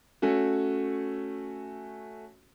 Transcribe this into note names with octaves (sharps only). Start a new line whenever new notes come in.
A3 C#4 F#4